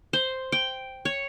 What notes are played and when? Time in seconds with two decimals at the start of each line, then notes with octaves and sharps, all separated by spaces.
0.13 C5
0.52 G5
1.05 C#5